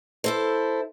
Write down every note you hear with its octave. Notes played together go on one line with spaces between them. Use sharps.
E4 A4 C5